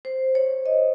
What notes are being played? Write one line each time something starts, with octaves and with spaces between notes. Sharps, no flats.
C5
C#5
D#5